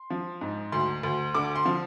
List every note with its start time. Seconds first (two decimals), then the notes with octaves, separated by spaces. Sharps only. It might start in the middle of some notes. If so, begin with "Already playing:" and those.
Already playing: C6
0.10 F3
0.41 G#2
0.72 D2 C6
1.03 D2
1.35 D3 D6
1.55 C6
1.65 F3